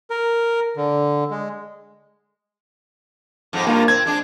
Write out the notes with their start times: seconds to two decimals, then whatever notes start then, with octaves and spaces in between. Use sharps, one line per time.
0.10 A#4
0.76 D3
1.31 G#3
3.53 F2 G#2 B3
3.67 G2 A#3 F4
3.88 C4 G#6
4.06 G#3 D4